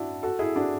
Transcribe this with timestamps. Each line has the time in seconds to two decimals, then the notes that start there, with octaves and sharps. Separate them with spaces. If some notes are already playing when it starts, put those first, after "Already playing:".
Already playing: D4 E4 F#4
0.23 F#4 A4
0.39 E4 G#4
0.56 D4 F#4